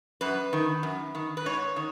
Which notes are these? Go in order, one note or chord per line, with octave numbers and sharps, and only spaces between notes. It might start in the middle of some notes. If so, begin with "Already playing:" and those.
F#2 B4
D#3
F#2
D#3
B4
G#2 C#5
D#3